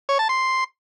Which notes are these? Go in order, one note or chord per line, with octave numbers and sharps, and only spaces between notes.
C#5
A5
C6